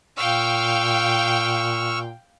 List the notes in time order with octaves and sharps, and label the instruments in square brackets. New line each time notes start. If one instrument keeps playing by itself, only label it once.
[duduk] A#2 [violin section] F5 G5 [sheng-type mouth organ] C#6 E6 F6